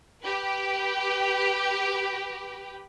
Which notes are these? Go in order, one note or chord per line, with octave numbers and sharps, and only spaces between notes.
G4 B4